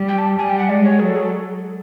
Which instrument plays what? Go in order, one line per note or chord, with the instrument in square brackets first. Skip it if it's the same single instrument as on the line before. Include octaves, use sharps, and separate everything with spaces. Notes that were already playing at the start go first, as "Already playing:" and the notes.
Already playing: [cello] G3
[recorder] G5
A5
[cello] G3 [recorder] G#5
[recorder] G5
F#5
[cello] G#3 [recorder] D5
[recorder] C#5
[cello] F#3 [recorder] G#4
[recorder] A4
G#4
A4